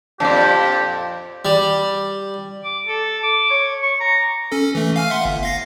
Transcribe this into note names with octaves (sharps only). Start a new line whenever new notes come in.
F2 A#2 D4 G4 D5
G3
D6
A4
D6
C#5
C#6
A#5
C#4 A4
E3 A3
F5 G#5 F6
E5 F#5 C6
G1
F5 A#6 C7